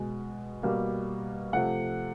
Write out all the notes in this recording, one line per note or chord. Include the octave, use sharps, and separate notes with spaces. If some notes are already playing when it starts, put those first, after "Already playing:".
Already playing: B2 G#3
B2 G3 A#3
C3 F3 A3 F#5